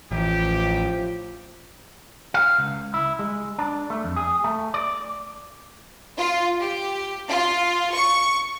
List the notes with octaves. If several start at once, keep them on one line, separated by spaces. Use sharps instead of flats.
A1 F3 G4
F5
C#2
E4
G#3
D4
A3
F2
G#4
A3
D5
F4
G4
F4
C#6